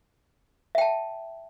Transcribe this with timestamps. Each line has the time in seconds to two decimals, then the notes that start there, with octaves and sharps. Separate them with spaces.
0.75 E5
0.78 G5
0.81 A5